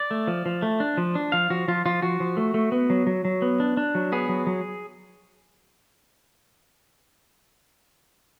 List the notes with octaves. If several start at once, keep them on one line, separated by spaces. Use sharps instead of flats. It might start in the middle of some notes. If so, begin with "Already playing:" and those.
Already playing: D5
A3
F3
F3
A3
D4
F3
D4
F3 F5
F3 F#4
F3 F4
F3 F4
F3 F#4
F3
A3
A3
B3
F#3
F#3
F#3
B3
D4
D4
F#3
B3 G#4
F#3
F#3